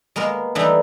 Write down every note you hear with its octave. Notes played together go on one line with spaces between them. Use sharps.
G#3 A#3 B3 A#4
E3 G3 A3 B3 D4 D#4